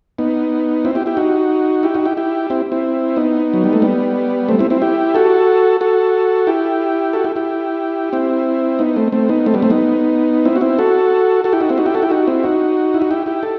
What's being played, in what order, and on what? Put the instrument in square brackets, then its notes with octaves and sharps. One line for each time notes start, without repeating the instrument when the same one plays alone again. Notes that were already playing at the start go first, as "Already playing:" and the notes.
[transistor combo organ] B3 D#4
C4 E4
E4 G4
E4 G4
D#4 F#4
E4 G4
D#4 F#4
E4 G4
E4 G4
C4 E4
C4 E4
B3 D#4
F#3
G3
A3
G3 B3
A3 C4
C4 E4
C4 E4
E4 G4
F#4 A4
F#4 A4
E4 G4
F#4 A4
E4 G4
E4 G4
C4 E4
B3 D#4
A3 C4
A3 C4
B3 D#4
A3 C4
G3 B3
A3 C4
B3 D#4
C4 E4
F#4
C4 E4
F#4 A4
F#4 A4
E4 G4
D#4 F#4
C4 E4
D#4 F#4
E4 G4
F#4 A4
E4 G4
D#4 F#4
C4 E4
D#4 F#4
E4
F#4
E4 G4
E4 G4
A4